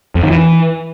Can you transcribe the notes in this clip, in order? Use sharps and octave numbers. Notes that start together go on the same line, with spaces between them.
F2
D#3
E3